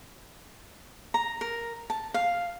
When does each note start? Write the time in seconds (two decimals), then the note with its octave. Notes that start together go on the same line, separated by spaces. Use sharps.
1.14 A#5
1.41 A#4
1.90 A5
2.14 F5